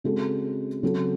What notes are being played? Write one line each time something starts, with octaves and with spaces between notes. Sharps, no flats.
C#3 G#3 C4 F#4 A4
C#3 F#3 C4 F#4 A4